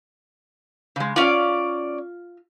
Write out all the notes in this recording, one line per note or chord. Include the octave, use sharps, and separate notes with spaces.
C#3 G#3
C#4 F4 D5 F5